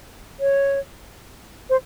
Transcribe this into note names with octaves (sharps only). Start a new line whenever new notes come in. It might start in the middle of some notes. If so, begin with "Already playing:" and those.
C#5
C5